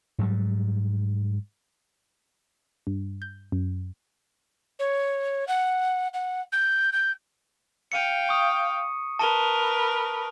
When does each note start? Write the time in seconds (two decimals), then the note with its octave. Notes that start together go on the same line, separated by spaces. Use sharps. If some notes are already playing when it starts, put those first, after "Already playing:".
0.19 G#2 F#3 G3
2.87 G2
3.22 G6
3.52 F#2
4.79 C#5
5.48 F#5
6.14 F#5
6.53 G6
6.93 G6
7.92 F5 G5 C#7 D#7
8.29 C#6 D#6
9.19 A#4 B4 A5 D#7 G7